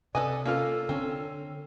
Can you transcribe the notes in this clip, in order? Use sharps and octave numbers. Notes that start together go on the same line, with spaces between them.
C3 A4 B4 D5 D#5 G#5
A#3 C#4 F4 A4 F6
D3 C4 C#4